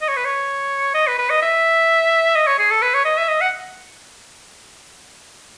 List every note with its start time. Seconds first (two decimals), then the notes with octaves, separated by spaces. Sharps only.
0.02 D#5
0.09 C#5
0.17 B4
0.25 C#5
0.94 D#5
1.07 B4
1.18 B4
1.30 D#5
1.42 E5
2.36 D#5
2.47 C#5
2.59 G#4
2.71 A4
2.82 B4
2.94 C#5
3.05 D#5
3.18 E5
3.29 D#5
3.41 F#5